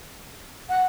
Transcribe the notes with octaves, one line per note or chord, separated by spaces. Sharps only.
F#5